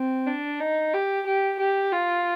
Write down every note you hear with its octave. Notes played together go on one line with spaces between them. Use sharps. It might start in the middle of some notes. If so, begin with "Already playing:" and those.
Already playing: C4
D4
D#4
G4
G4
G4
F4